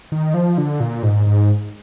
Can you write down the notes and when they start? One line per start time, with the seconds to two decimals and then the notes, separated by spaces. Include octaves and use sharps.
0.12 D#3
0.34 F3
0.58 D3
0.80 A#2
1.03 G#2
1.27 G#2